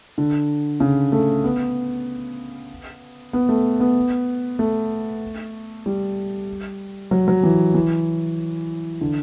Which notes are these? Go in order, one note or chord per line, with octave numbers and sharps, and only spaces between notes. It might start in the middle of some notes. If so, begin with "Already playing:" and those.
D3
C#3
A3
B3
B3
A3
B3
A3
G3
F#3
F#3
E3
E3
D3